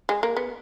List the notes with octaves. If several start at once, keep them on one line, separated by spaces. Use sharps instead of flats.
G#3
A#3
B3